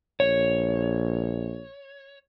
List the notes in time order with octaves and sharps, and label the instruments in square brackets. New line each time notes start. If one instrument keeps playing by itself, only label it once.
[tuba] A#1 [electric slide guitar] C#5